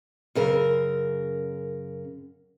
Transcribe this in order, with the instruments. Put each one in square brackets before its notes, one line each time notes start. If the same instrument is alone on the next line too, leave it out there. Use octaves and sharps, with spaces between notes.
[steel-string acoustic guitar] F#2 C#3 A#4